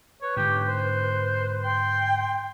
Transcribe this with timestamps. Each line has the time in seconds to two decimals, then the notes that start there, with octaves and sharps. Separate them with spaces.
0.22 B4 C#5
0.37 G#2 D3 G4
0.67 C5
1.63 G5 C6